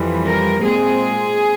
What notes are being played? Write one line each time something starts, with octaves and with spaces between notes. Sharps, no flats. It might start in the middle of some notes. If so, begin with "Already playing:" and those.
Already playing: F2 E3 G3
A#4
A#2 G#3 C4 G#4